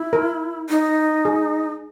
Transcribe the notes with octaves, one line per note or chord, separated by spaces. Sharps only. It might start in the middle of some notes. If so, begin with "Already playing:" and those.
Already playing: E4
A#4
D#4
G#4